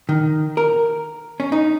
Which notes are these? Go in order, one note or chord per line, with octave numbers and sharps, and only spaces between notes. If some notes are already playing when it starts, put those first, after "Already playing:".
D#3
A#4
C#4
D#4